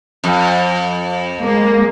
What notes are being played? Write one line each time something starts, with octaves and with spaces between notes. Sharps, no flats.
F2
G#3 A#3